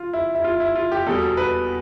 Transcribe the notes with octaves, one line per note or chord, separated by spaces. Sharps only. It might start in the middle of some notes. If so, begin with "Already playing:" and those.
Already playing: F4
E4
E4
F4
E4
F4
G4
E2 B2 G3 A4
B4